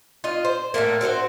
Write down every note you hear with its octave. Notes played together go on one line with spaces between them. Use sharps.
F4 D#5
C5
A2 D3 A3 A#3
C4 F#4 B4 C5